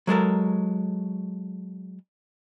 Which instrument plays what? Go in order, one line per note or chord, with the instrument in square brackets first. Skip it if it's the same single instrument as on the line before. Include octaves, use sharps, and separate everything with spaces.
[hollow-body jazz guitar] F#3 G#3 A4 A#4